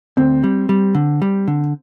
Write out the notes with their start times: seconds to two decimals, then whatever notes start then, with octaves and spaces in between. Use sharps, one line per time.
0.17 D2 C4
0.44 G3
0.69 G3
0.95 D3
1.22 G3
1.48 D3